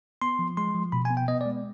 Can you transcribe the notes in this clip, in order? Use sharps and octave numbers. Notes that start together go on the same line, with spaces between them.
B3 C6
F3
G#3 C6
F3
B2 B5
G#5
B3
G5
B3 D#5
D5
G#3